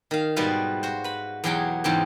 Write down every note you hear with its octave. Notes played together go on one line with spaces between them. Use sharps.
D#3 F5
G#2 B2 G3 F4 B4 F5
F#4 C5
B4 B5
E2 B2 F#3 G4 G#4 G5
E2 G#2 C#3 C4 G4